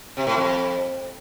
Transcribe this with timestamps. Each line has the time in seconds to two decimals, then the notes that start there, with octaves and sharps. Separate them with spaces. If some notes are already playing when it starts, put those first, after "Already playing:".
0.17 C3
0.27 A2
0.37 F2